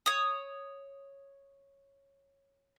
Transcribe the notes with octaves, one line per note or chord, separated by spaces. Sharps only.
C#5 D#6